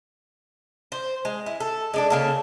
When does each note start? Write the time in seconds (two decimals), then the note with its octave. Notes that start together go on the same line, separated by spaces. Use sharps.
0.92 C5
1.25 G#3
1.46 E4
1.60 A4
1.94 G#3 D4 A4
2.10 C#3 A#3 A4